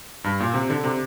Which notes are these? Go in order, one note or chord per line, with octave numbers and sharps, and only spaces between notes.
G2
A#2
C3
D3
C3